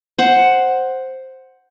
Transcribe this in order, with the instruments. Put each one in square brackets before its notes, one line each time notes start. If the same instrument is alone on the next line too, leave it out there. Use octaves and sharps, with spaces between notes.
[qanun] C5 F#5